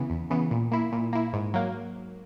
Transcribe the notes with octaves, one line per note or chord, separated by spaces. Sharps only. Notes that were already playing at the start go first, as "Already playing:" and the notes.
Already playing: C#3 E3 B3
E2
C#3 E3 B3
A#2
A#3 E4
A#2
A#3 E4
G#2
F#3 A#3